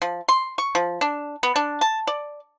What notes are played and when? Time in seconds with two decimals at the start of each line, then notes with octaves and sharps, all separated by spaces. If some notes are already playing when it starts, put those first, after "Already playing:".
0.02 F3
0.28 C6
0.58 C#6
0.75 F3
1.01 D4
1.43 B3
1.56 D4
1.81 A5
2.07 D5